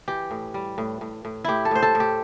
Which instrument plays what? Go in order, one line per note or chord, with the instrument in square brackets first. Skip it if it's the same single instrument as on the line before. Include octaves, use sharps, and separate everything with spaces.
[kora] E3 G4
A2
G3
A2
A2
A2
A2 E4 G4
A4
A2 C5
A4
A2
G4